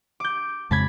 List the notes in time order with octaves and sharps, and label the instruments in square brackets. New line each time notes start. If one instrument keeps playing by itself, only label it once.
[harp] D6 G6
[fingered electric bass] F2 C#3 G#3 [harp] A5 B5 G#6